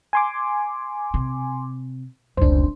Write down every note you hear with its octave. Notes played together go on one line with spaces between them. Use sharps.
G#5 C6 D6
C3
F1 C#2 D4 C5